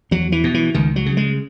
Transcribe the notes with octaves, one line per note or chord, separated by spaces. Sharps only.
E2 F#3
E3
B2
E3
C#2 D#3
F#3
C#3
G#3